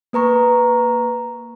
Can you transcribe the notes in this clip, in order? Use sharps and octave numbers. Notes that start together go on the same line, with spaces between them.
A#3 B4 A#5 C#6